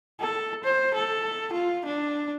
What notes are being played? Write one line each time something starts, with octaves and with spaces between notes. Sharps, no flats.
A4
C5
A4
F4
D4